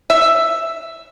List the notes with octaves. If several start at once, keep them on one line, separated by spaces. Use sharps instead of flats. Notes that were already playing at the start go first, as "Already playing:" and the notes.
E5